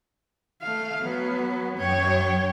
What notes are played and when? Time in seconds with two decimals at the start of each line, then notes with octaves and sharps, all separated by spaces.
0.62 A3 F5
1.02 F#3 B3
1.78 F#2 C#5 G5